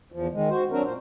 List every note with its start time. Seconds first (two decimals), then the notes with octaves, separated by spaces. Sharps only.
0.12 E2 F3
0.33 D#3 G#3
0.49 F#4 C5
0.72 F#3 C4 D4 F#4 A#4
0.84 A#2 C5